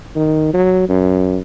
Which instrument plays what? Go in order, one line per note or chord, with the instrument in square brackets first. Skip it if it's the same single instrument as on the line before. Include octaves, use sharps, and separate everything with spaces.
[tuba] D#3
F#3
F#2